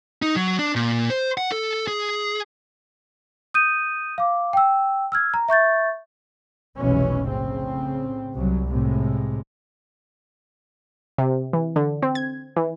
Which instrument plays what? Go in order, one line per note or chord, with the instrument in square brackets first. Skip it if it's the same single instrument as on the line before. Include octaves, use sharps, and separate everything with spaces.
[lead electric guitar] D#4
F#3
D4
A#2
C5
F#5
A4
G#4
[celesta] D#6 G6 D#7
F5 D6
G5 E6
E6 F6 G#6
A#5
E5 C#6 G6 A6
[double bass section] F1 B1 B2 E3 G#3 C#4
A2 C#3 C4
C2 F#3
A2 C3 G#3
[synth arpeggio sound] C3
E3
D3
C4
G#6
E3